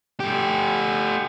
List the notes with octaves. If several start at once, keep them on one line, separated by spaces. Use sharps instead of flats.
A3 G4